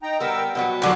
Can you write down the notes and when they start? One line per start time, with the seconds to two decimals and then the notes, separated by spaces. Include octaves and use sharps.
0.03 D#4 G5 A#5
0.20 G3 B3 A#4 G5 E6
0.55 B2 F#3 G3 B3
0.82 D#2 D3 F#3 B3